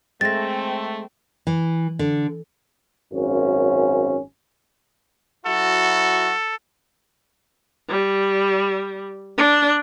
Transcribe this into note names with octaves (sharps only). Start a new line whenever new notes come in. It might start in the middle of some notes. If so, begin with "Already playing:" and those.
G#3 A3 C4 A6 A#6
E3
D3
G#1 F#2 C#4
F#3 E4 F#4 A4
G3
D4